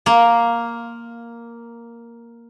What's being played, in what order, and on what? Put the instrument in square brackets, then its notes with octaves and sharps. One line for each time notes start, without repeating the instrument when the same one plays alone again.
[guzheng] A#3 C6